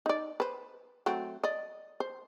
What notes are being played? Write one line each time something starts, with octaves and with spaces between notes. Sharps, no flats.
D#4 D5
B4 C5
F#3 A3 C4
D5 D#5
C5